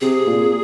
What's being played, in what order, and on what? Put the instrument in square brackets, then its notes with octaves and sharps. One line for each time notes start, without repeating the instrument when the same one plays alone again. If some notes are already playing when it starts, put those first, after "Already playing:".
[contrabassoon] C3 [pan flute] G#4
[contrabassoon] A#2